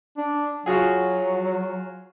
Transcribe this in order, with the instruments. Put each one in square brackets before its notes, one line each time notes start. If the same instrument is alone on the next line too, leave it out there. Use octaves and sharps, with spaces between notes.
[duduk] D4
[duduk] F#3 [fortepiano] F4 F#4 G#4